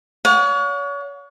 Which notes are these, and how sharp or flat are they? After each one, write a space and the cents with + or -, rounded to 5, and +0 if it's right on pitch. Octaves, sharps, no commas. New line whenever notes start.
C#5 +35 F#5 -45